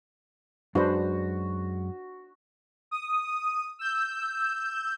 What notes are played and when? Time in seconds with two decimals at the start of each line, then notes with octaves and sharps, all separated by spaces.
0.75 F#2 G#3 D4 F#4 B4 C5
2.91 D#6
3.79 E6 G6